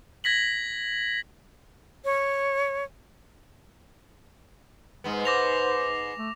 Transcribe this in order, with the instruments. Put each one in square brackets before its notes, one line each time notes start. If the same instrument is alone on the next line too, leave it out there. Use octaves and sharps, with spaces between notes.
[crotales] G#6 A#6 B6 F#7
[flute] C#5
[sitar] G#2 B3 [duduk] G#3
[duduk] C5 [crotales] D6 A#6 F7
[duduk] A3